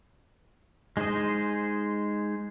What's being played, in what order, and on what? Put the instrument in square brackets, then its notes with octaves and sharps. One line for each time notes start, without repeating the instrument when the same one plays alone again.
[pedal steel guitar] G#3 D#4 G#4 C5 D#5